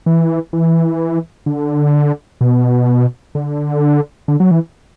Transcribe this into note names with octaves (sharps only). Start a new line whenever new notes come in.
E3
E3
D3
B2
D3
D3
F#3
E3